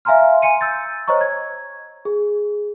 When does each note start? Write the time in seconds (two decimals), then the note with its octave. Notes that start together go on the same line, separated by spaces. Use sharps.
0.05 E5 F5 G#5 A#5 C6 F6
0.42 G#5 C6 C#7 D#7
0.61 E6 G6 A6
1.08 C5 C#5 D#5 A#5 C#6
1.21 G#6
2.05 G#4